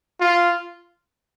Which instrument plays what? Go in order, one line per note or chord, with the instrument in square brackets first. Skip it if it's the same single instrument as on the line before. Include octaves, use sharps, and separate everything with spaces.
[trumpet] F4